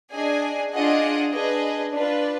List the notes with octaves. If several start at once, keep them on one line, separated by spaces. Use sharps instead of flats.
D4 G#4 D#5 G#5
D4 F4 G#4 D#5 F#5
D4 G#4 B4 D#5
D4 F4 B4